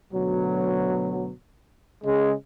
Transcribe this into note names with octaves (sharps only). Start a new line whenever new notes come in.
D2 B2 F#3
C#3 G#3